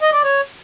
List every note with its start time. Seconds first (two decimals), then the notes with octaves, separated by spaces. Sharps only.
0.01 D#5
0.12 D5
0.24 C#5